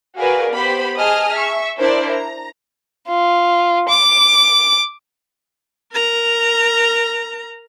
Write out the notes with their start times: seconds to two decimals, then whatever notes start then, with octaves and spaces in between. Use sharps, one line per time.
0.17 F#4 G#4 A#4 B4 D5 F5
0.53 B3 G4 C5 B5
0.95 G#4 D#5 A5 D#6 F6
1.34 E5 C#6
1.77 D4 E4 A#4 C5 D5
2.10 A#5
3.08 F4
3.89 D6
5.92 A#4 A#5